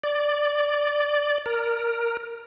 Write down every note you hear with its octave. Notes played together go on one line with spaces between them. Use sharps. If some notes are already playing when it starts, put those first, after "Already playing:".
D5
A#4